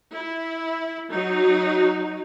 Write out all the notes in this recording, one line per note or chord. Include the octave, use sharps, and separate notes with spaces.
E4
F#3 D#4 F#4